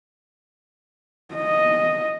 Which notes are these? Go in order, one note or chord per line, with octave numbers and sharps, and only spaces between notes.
D#5